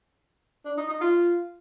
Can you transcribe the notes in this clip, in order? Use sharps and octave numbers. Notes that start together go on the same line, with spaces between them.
D4
D#4
D#4
F4